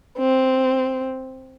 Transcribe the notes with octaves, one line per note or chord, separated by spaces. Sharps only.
C4